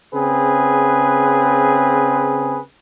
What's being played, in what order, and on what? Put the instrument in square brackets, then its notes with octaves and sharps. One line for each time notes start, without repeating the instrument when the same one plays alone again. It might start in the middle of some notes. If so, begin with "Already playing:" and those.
[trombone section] C#3 C4 G#4 B4